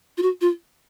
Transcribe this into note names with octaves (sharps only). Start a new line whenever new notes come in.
F4
F#4
F4